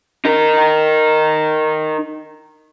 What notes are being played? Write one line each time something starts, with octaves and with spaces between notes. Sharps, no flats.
D#4 A#4